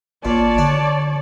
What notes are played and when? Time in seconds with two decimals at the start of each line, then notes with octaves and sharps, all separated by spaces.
0.25 G#1 A#2 C#5 D5 A5
0.58 D3 D4